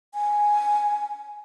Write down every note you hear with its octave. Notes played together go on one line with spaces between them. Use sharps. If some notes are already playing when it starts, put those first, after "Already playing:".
G#5